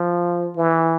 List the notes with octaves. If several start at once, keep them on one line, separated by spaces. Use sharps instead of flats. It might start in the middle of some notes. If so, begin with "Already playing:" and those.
Already playing: F3
E3